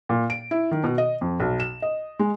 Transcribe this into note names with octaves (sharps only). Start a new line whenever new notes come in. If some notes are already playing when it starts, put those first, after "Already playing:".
A#2
D7
E4
D#3
B2
D#5
F2
B1
E7
D#5
G#3